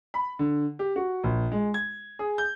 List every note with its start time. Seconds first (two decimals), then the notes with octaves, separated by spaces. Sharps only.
0.14 B5
0.39 D3
0.79 G4
0.96 F#4
1.24 A#1
1.52 G#3
1.74 G#6
2.19 G#4
2.38 G6